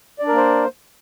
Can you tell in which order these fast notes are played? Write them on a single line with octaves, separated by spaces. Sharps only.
D5 D4 A#4 A#3 C5